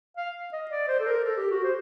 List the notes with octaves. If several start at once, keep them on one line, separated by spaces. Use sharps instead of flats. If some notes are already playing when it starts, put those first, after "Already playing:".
F5
D#5
D5
C5
A4
A#4
A4
G4
F#4
C5